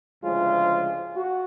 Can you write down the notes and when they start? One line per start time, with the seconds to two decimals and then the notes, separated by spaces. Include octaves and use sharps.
0.23 D2 C#3 F3 G#3 F4
1.16 F#4